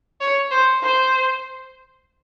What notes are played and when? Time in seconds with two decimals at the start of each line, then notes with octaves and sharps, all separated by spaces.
0.21 C#5
0.51 C5
0.82 C5